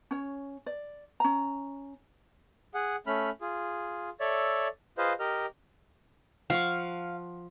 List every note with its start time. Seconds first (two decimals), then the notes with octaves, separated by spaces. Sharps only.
0.11 C#4 C#5
0.66 D5
1.20 C#4 A#5
2.74 G#4 F#5
3.07 A3 C#4 B5 F6
3.41 F4 G#4
4.20 A4 C#5 D5 E5
4.98 F4 G#4 B4 C5 D#5 F5
5.19 G4 A#4 D#5 F6
6.50 F3 F5 F#5 C#6